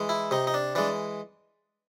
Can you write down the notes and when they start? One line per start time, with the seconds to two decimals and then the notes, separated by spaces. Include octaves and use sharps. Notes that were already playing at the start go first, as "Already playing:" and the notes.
Already playing: E3 G#3
0.09 E4
0.31 C3 D#4
0.47 D#4
0.54 D4
0.75 E3 G#3 D4